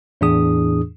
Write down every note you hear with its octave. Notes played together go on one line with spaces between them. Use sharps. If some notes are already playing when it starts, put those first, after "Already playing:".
E2 A2 E3 D4 G#4 D#6